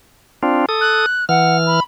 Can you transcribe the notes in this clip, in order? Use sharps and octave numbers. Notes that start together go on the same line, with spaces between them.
C4 D4 F4
A4 D#6
F#6
E3 F#5 F6
B5